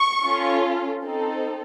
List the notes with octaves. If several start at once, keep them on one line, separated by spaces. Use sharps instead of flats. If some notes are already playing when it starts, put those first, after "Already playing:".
Already playing: C#6
C#4 F4 A4
C4 D#4 A4